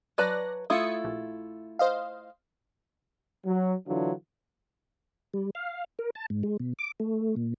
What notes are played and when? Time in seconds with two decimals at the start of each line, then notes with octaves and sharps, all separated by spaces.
0.18 F#3 B4 D5 A5 F#6 A#6
0.70 A3 E4 F4 D#6 G#6 C#7
1.05 A#1
1.79 C5 D#5 F5
3.46 F#3
3.87 D3 E3 F#3 D4 F4
5.34 G3
5.55 F5
5.99 A#4
6.15 A5
6.30 G#2
6.43 G#3
6.60 B2
6.79 D6
7.00 A3
7.36 A#2